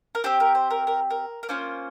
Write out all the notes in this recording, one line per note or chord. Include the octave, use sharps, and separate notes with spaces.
A#4
C4 G4 C5
A#4
C5
A#4
A#4
A#4
A#4
A#3 C#4 F4 C5